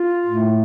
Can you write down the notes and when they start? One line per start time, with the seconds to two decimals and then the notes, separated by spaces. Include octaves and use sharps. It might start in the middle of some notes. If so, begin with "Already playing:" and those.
Already playing: F4
0.26 A2 A3